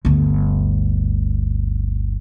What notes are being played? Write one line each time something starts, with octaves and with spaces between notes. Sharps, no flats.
G1 D2